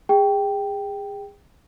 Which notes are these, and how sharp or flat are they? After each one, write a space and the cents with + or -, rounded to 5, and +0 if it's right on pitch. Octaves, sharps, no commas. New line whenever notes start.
G#4 -30 G5 +0